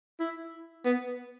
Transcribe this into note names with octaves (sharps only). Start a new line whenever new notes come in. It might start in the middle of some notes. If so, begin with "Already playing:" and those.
E4
B3